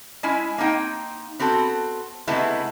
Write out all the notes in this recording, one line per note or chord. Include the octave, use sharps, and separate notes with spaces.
G#3 C#4 E4 G#5
A#3 C4 D#4 G5
B3 C4 F#4 A4
C3 G#3 A3 B3 E4